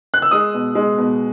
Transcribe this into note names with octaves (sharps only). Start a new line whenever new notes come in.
F#6
E6
G#3 D#6
B2
G#3
B2